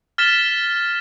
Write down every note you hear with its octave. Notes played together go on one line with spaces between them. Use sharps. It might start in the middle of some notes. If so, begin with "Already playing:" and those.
F6 A6 B6 E7 G7